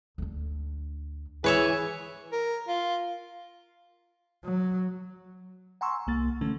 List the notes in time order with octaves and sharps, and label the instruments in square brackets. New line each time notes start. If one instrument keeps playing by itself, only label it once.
[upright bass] D2 D4
[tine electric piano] E3 [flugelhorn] G#4 [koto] B4 C#5 E5
[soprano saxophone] A#4
F4
[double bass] F#3
[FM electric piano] F#5 G#5 A#5 C6 C#6 E6
C2 A#3 A6
D3 E3 A3 C#4